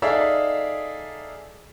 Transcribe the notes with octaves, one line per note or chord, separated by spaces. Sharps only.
D#4 G#4 A4 D5 E5 F5